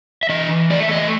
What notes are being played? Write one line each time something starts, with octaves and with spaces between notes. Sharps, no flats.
E5
E3 D#5
A3 D5
E5
D#5